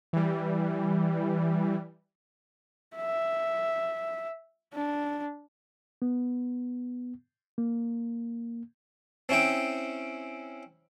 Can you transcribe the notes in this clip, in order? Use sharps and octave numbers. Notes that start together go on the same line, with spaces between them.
E3 G3
E5
D4
B3
A#3
C4 C#4 E4 G5